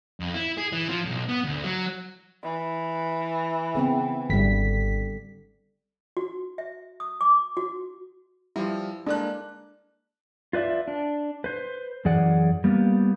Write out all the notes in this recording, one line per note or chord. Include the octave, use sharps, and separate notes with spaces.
F2
E4
G#4
E3
F3
B1
B3
D2
F#3
E3
C#3 B3 C4
G#1 D3 G3 B6
F#4
E5
D#6
D6
F#4
F3 G3 E4
G#3 A#3 D4 F#6
F4 B4 D5 E5
D4
B4 C5
F#2 E3 G#4 D5 F#5
G3 A#3 B3